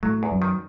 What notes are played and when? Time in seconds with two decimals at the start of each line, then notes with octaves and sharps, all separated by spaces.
0.03 A2 F#3 A3
0.23 E2
0.32 F#2 F#3
0.42 D#3